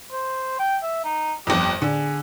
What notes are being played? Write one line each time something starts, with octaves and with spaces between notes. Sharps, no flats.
C5
G5
E5
D#4
G1 F2 G4
D3 G#4